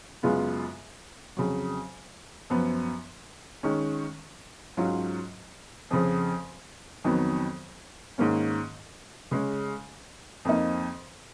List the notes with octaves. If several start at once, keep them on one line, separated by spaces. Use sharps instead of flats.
F#2 C#3 G#3 B3 F4
F2 C#3 F#3
F#2 F3 B3
D#3 G#3 C#4
G#2 F#3 C#4 F4
F2 C#3 F3
F2 D#3 F#3 B3
G#2 D#3 A#3 C#4
C#3 G#3 C#4
F2 F3 A#3 D#4